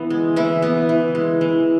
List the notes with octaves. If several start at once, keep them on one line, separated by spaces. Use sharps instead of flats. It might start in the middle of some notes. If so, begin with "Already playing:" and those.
Already playing: E3 B3
G#3
E3 E4
B3
E3
G#3
E3